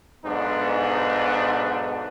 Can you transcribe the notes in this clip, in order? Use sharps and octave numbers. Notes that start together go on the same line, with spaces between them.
B1 G#2 B3 D4